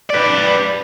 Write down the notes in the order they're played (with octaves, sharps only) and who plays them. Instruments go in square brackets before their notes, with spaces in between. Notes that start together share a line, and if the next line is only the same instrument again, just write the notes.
[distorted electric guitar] B4 D5